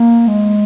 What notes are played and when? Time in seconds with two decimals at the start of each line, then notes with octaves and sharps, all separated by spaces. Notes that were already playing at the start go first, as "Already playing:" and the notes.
Already playing: A#3
0.27 G#3